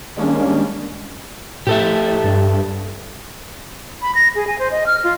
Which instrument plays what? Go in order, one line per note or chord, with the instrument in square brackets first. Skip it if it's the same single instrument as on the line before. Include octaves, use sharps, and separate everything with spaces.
[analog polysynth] D#3 G3 G#3 A#3 C#4 D4
[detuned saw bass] A2 [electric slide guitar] G4 A4 E5
[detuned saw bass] G2
[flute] B5
A#6
G#4
G#5
C5
D#5
F6
F4